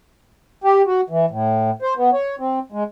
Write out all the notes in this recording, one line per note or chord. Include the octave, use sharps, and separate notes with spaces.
G4
F#4
E3
A2
C5
B3
C#5
C4
G#3